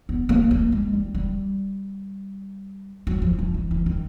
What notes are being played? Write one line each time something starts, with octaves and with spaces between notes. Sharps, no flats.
B3
A#3
A#3
G#3
G3
G3
F#3
F3
F3
E3
E3
D#3